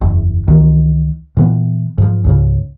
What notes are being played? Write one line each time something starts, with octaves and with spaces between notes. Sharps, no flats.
F#1 E2
C#2 D#3 E3
A#2 E3 B3
G#2 F3
C#2 G#2 C#3